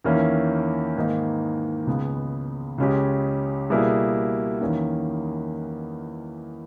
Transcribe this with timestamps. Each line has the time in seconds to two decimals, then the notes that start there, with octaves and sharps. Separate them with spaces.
0.04 E2 D#3 A#3 C#4 E4
0.96 G#2 D#3 A#3 D#4
1.87 C#2 C#3 G#3 B3
2.78 C#2 C#3 G#3 C#4 G4
3.70 B2 G3 A#3 E4 G#4
4.61 E2 D#3 A#3 C#4